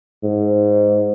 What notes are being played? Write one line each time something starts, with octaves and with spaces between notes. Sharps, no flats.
G#2